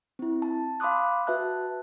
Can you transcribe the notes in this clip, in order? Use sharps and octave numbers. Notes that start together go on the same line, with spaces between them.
C4 E4
A5
F5 B5 C6 D6 D#6 F#6
F#4 B4 E5 A5 F#6